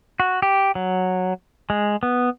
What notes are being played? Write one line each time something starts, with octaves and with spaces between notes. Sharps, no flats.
F#4
G4
F#3
G#3
B3